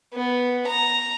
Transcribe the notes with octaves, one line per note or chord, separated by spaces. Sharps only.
B3
A#5